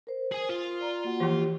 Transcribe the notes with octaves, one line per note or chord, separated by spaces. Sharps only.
A#4 C5
G#4 G#5
F4
D5 A#5
A#3 F#4 F#5
E3 F3 A#3 G4